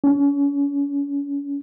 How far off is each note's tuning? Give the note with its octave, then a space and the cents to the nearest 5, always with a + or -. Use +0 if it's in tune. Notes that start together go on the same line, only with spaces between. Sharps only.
C#4 +35